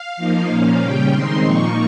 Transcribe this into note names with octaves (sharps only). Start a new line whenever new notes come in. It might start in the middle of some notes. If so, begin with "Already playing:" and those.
Already playing: F5
F3 A#3 D#4
A#2 F3 A#3 C#4
C#3 G3 C#4 G5
D#3 G#3 C4 D#4 C6
A#2 F3 A#3 D#4 C#6